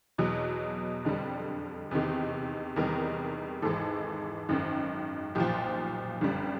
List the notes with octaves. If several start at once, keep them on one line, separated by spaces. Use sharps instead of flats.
E2 B2 F#3
F2 D3 G3
E2 C3 D#3
E2 C3 D#3 G3 A#4
G#1 G#2 E3 A4
G#1 F#2 D#3
B1 A#2 F3 G4
G1 F#2 D3 G3